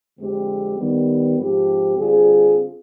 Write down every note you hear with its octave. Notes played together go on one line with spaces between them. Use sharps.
F2 D3 G#3 C4 G4
D#3 G3 B3
G#2 F3 C4 G4
D3 G3 C4 F4 G#4